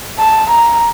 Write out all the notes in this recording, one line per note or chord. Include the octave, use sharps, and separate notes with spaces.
A5
A#5